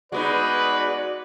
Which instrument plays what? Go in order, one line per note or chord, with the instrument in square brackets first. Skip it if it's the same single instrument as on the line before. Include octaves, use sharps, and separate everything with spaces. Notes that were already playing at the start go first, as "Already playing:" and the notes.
[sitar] G#3 B3 D#4 [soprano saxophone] F#4 [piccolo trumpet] B4 [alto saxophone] D5